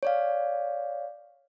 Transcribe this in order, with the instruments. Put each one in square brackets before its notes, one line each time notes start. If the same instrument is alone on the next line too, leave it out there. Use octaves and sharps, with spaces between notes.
[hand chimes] C#5 D5 F5